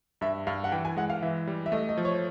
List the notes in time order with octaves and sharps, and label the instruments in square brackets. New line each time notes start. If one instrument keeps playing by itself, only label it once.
[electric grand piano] G2 [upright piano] E5
[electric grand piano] G2 [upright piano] F5
[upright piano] F#5
[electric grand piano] E3 [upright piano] G5
[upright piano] G#5
[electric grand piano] G#3 [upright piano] F#5
[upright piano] F5
[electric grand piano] E3 [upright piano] E5
[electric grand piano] G3
[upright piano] E5
[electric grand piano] A3 [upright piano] D#5
[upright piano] D#5
[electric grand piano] F3
[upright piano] C#5